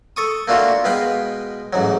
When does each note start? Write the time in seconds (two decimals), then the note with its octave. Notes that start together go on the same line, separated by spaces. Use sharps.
0.16 A4 C#6 D#6
0.48 A3 A#3 D4 F4 F#4
0.84 B2 G#3 B4 F5 G5
1.73 A1 G#2 F#3